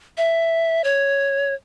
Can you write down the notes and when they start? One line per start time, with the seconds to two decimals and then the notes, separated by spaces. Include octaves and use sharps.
0.18 E5
0.84 C#5